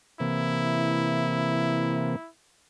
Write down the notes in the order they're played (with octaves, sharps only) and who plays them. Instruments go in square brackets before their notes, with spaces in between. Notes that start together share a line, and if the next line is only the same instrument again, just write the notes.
[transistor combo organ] C3 E3 A#3 [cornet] E4